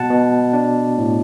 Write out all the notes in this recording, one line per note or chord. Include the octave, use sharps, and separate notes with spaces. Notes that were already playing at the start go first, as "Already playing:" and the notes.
Already playing: B2 F#5 A5
B2
D4
A2